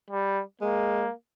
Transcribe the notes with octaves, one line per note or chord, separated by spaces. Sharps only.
G3
G#3 A#3